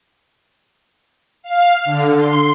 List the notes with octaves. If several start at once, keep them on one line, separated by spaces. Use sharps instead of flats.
F5
D3
C6